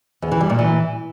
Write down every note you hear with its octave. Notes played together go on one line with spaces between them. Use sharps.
E2
E3
G3
A#2
E3